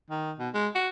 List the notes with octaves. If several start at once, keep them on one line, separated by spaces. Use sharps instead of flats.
D#3
B2
G#3
F#4